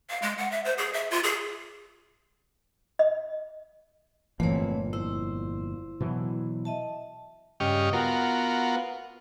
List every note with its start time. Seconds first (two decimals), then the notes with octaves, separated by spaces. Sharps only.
0.10 F5
0.22 G#3
0.38 F#5
0.52 E5
0.65 C5
0.78 G#4
0.93 E5
1.11 F4
1.24 G#4
2.99 D#5
4.40 G1 F2 A#2 E3 A3 C4 C#5
4.93 E4 C5
6.01 B2 E3 F#3
6.65 D#5 E5 A5
7.60 G2 C#3 G4 D#5 C#6 F6
7.93 B3 F4 F#4 A#4